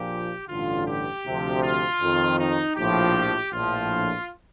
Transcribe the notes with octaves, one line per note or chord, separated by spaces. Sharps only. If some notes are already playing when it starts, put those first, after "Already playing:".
Already playing: A#1 A#2 F3 G4
A1 G2 D3 F4
G4
D2 C3 F3
F4
F2 D#3
D#4
A#1 A2 F3 G4
A#1 A2 F3 F4